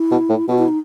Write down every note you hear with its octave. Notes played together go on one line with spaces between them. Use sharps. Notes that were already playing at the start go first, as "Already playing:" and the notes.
Already playing: E4
B2
A2
B2 F#4
E4
D#4